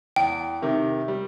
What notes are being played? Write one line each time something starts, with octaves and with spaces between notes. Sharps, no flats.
E2 G5
C3 D#3
G3